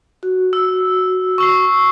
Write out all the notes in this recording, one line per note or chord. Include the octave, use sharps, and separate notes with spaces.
F#4
E6
C#6 E6 C7